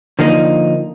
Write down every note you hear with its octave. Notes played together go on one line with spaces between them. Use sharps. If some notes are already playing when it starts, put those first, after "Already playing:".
D3 F3 A#3 D#4